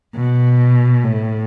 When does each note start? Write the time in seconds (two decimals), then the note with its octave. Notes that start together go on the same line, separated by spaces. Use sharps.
0.16 B2
1.04 A2